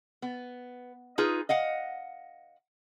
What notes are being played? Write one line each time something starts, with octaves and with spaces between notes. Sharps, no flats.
B3
D#4 F4 G#4 B4
D#5 F5 F#5